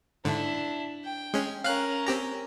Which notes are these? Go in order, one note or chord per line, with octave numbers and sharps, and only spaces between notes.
G#2 D3 D4 E4
G5
G#3 C#4
C#4 A#4 F5 F#6
C4 G4 A#5